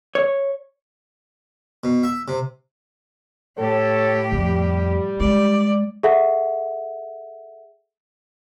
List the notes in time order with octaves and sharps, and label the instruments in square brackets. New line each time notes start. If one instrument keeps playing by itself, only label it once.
[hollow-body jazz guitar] C#5
[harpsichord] B2
E5
C3
[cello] A2 G4 [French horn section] A4 C#5
[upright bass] F2 [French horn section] G3
[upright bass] G#3 [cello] D5
[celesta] G#4 A4 E5 F#5